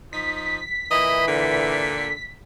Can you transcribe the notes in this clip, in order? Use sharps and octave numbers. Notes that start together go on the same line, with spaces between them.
F3 D#4 B6
A#2 E3 E4 D#5
A#2 D3